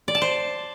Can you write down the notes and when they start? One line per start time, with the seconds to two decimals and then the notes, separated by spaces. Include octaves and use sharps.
0.08 D5
0.15 A5
0.22 C5